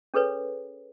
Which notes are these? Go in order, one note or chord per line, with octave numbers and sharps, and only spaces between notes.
C#4 G#4 A4 B4 C#5